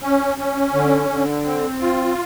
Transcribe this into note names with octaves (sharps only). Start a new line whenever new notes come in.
C#4
C#4
D3
D3
C4
F4